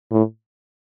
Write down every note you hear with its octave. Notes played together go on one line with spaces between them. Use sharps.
A2